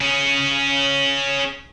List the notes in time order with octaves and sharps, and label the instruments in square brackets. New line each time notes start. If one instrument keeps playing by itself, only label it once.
[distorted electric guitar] C#4 G#4